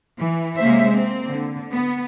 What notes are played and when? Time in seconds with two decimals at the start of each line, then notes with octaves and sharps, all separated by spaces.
0.16 E3
0.57 C3 G#3 A#3 C#4 C5 E5
0.88 A#3 C4
1.25 D3
1.72 B3